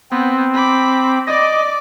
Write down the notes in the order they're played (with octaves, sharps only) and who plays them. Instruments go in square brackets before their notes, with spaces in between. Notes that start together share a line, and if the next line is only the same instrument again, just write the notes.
[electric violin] B3 [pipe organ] C4
[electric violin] B5 D6
[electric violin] D5 D6 [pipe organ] D#5